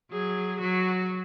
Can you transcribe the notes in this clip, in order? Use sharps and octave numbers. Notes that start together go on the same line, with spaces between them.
F#3 G#4
F#3 F#4